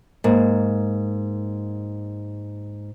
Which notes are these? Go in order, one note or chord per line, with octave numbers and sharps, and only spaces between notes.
G#2 A#3